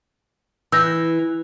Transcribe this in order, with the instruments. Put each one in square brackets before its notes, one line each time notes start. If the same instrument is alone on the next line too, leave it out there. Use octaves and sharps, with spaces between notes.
[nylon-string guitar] E3 [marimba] E6 G6 A#6